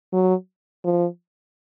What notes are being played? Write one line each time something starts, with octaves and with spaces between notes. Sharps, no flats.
F#3
F3